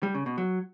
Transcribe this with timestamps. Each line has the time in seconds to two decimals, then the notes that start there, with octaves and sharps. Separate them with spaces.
0.03 G3
0.14 C#3
0.26 B2
0.38 F#3